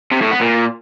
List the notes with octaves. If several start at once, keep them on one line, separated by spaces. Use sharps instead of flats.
C3
A2
B3
A#2